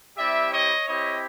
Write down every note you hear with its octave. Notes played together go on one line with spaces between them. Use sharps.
G3 C4 E4 G4 D5 E5
C#5 D#5
C4 E4 G4 C#5 D#5